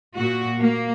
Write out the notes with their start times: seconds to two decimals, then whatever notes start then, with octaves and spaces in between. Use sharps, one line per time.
0.16 A#2 A#3 F#4
0.60 A#3